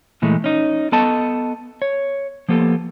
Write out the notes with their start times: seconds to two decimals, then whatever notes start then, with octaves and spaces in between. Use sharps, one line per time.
0.22 A#2 E3 G#3 A3
0.44 C#4 D#4
0.92 B3 A4 D#5 A5
1.82 C#5
2.49 F3 A#3 B3 G4 A4